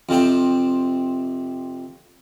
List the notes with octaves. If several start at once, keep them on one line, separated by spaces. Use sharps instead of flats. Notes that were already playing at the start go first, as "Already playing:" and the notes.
F2 C3 C4